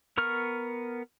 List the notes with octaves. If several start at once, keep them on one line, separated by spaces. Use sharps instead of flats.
B3 A#4 C#6 F6